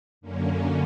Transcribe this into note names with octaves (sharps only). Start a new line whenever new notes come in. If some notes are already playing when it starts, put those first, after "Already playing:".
F#2 D3 A#3 C#4